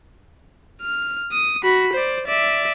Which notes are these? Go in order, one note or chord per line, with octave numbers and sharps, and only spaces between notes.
F6
D#6
F#4 B5
C5 D5
D5 E5